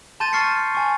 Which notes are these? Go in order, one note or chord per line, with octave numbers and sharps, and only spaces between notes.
A5 C6 G6 A6 D#7
C#6 F6 A6 C7 C#7
G#5 C#6